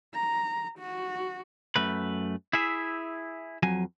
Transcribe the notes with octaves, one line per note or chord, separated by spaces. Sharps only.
A#5
F#4
F#2 A3 B4
E4 G#4 E5
F2 F#3 G#5